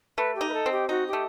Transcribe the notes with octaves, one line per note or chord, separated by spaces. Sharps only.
A3 B4
G4
D#4
B4
A4
C4
G4
D#4 F#4
G4
A3